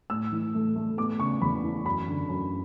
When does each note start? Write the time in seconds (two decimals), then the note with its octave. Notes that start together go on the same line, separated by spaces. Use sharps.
0.10 A2 E6
0.32 E3
0.54 A3
0.76 A3
0.97 B3 D6
1.19 C#3 C#6
1.41 E2 B5
1.64 E3
1.85 F#2 B5
2.08 D3
2.29 F#2